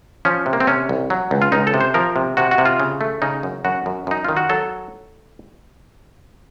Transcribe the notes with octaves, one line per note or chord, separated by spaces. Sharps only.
F3 C#4
C3
A#3
C4
C3 C#4
C2
F#3
C#2
F4
C#2 D#4
A4
C3
C5
F3 A#4
C3
C3 F#4
F#4
C3
F4
C#3
A3
C#3 D#4
F#2
F#2 F#4
F#2
F#2 D#4
D#3 F4
F#4
F#3 A4